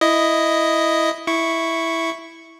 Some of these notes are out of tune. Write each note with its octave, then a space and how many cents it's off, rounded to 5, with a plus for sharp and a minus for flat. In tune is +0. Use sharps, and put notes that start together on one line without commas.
E4 +0 D#5 +0
E4 +0 C#6 +0